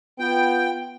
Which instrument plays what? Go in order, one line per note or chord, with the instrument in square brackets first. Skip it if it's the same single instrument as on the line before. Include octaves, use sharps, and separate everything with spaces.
[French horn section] B3 F4 [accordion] G5